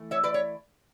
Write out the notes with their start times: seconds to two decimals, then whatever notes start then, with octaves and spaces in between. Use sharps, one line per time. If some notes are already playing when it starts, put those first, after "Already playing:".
Already playing: E3 A3
0.11 C#5 E5
0.24 B4 D5
0.34 C#5